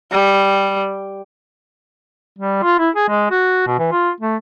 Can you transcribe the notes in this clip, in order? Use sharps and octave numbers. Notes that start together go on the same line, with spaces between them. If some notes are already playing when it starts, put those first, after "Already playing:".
G3
G3
F4
E4
G#4
G#3
F#4
B2
E3
F4
A3